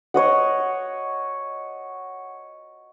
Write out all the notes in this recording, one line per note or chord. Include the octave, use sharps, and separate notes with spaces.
C#5 D#5 F#5